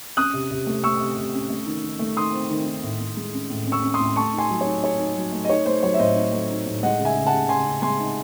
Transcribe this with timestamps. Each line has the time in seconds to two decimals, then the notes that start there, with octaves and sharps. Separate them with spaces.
0.17 C#4 D#6 F#6
0.33 C3
0.51 C3
0.67 A3
0.84 A3 C#6 E6
1.00 C3
1.16 C3
1.34 C#4
1.50 A3
1.66 D#3
1.84 D#3
1.99 A3
2.16 D#3 C6 D#6
2.33 C4
2.50 D#3
2.66 D#3
2.83 A2
3.00 A2
3.17 G#3
3.34 C#4
3.50 A2
3.66 C#4
3.72 C#6 E6
3.82 C#4
3.94 C6 D#6
4.00 A2
4.16 A3 A5 C#6
4.34 D#4 G#5 C6
4.50 F#3
4.61 C#5
4.67 D#4
4.83 D#4 C#5
4.99 D#4
5.17 F#3
5.32 A3
5.44 D#5
5.49 D#4 C#5
5.66 A3 C5
5.83 F#3 C#5
5.94 E5
5.99 A2 C5 D#5
6.16 D#4
6.33 A3
6.50 D#4
6.66 A2
6.83 G#3 D#5 F#5
6.99 C#3
7.05 E5 G#5
7.15 C#3
7.27 F#5 A5
7.32 C#3
7.49 C#3 G#5 C6
7.67 C#3
7.82 G#3 G#5 C6
8.00 D#4